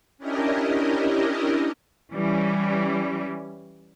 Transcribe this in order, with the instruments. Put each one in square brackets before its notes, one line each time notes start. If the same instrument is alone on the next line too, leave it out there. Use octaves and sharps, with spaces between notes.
[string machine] C#4 D4 E4 G4 A#4 D#5
[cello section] E3 G3 C#4